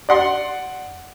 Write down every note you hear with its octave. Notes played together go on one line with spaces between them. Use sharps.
D5 F#5 C6